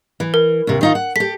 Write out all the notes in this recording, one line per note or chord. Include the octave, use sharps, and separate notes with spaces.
E3
A#4
D#2 C3
D#3 D#4 F4
F#5
G4 A4 B6